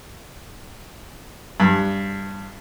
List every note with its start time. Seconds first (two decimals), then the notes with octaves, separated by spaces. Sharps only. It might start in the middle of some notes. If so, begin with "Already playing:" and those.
1.60 G2